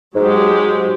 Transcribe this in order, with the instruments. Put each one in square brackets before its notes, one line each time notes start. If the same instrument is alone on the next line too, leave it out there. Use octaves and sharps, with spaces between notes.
[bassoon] G#2 [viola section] F#3 G#3 G4